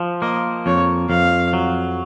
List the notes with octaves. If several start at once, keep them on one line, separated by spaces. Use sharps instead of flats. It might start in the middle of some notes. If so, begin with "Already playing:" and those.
Already playing: F3
A#3 D#5
F2 C#5
F2 F5
F#3